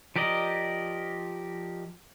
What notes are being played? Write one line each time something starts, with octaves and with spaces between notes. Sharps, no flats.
F3 G4 A#4 D5 D#5